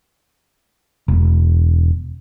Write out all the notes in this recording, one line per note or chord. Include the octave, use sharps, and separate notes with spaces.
E1